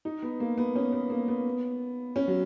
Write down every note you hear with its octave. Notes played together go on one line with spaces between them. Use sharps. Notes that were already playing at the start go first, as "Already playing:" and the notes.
D#4
B3
A#3
B3
C#4
B3
A#3
B3
C#4
F#3